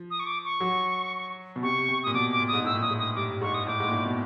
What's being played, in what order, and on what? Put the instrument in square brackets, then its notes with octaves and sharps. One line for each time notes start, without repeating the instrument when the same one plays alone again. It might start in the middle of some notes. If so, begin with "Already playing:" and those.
Already playing: [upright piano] F3
[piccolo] D#6
C#6
D6
C#6
[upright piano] F#3
B2
[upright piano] C3 [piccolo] C#6
[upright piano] C3
[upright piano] A#2 [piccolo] D#6
[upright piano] B2 [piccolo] D6
[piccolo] D6
[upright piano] A#2
[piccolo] D#6
[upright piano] G#2
[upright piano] A2 [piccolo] E6
[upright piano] A#2
[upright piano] A2 [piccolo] D#6
[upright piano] G#2
[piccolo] D#6
[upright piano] G2 [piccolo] D6
[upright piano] G#2 [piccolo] C#6
[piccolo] D#6
[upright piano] A2 [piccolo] D6
[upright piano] G#2
A#2
A2
B2